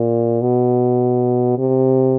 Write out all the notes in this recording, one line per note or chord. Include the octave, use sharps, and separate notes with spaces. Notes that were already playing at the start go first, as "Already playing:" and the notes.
Already playing: A#2
B2
C3